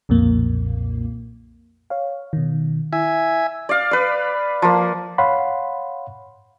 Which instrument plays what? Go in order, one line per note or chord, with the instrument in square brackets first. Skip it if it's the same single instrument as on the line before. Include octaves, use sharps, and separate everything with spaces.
[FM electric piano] B1 F2 A#2 A#3
C#5 F5
B2 D#3
[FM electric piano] E4 [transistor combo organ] E5 G#5
[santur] D5 F5
B4 D5
F3 A#3
[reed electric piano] C#5 F5 F#5 B5 C6